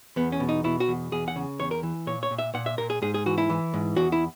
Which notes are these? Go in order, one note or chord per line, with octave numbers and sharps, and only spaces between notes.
E2 B3
C#4
B2
D#4
B2 E4
F#4
E2
E2 G#4
F#5
C#3
E2 C#5
A#4
E3
A#2 C#5
C#5
A#2
E5
A#2 F#5
E5
A#2 A#4
G#4
G#2 G#4
G#4
E3 F#4
E4
E3
G#2
E2 F#4
E4